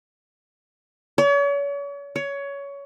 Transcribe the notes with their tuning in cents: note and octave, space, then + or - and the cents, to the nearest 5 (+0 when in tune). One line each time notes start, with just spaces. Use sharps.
C#5 +40
C#5 +20